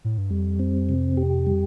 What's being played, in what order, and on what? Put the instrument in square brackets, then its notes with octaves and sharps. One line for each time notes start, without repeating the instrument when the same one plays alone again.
[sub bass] A2
G2
[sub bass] F2 [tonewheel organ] G3
[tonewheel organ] C4
C3
G4
G3